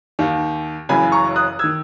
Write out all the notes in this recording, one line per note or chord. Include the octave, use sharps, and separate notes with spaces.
D#2 D#3
F#1 F#2 C#3 E3 G#5 B5
A#5 C#6
D#6 F#6
D#3 E6 G#6